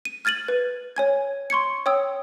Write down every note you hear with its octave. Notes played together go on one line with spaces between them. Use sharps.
D#7
F6 G#6 A6 D#7 F#7
B4
C#5 G#5 G#6
C6 C#6 G#6 C#7
C#5 G5 D#6 E6